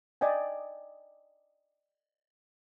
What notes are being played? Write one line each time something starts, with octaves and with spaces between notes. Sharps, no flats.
D5 D#5 G5 G#5